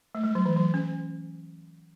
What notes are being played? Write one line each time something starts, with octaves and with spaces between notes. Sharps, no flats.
A3
G#3
F#3
E3
F#3
C#4